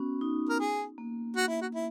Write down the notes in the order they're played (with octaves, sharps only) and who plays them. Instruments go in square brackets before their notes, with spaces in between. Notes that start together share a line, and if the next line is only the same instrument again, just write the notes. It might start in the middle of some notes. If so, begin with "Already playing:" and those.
Already playing: [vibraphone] B3 C#4 F#4
D#4
[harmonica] A#4
G#4
[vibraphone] A#3
[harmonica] F#4
E4
F#4
E4